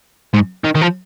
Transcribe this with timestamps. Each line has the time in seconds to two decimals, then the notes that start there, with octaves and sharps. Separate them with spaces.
0.34 G#2
0.65 D#3
0.75 D#3
0.81 F3